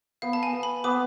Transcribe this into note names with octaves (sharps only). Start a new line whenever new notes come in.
B3 F5
A5
G#5
B3
B5
B3 D6